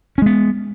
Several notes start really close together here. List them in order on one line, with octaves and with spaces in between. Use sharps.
C#4 G#3 B3